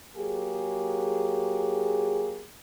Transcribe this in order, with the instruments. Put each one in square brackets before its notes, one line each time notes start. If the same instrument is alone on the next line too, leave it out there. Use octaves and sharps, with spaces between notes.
[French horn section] F#3 A#3 G4 G#4